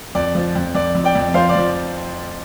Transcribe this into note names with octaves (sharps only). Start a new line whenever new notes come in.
F2 D5
F3
F2
F2 D5
F2
D5 G5
F2
F3 C5 F5
D5
F3